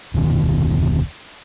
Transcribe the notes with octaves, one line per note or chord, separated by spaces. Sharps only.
F1 D2 B2 D#3